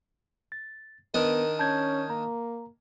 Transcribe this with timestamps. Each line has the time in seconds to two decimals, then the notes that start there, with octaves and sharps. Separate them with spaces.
0.52 A6
1.14 D#3 B3 D4 A#4 B4 D#5
1.59 C#4 A5 G6 G#6
2.10 A#3 A#5